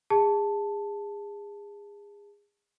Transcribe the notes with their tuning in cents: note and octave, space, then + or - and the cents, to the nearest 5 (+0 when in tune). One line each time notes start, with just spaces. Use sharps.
G#4 -30 A5 +0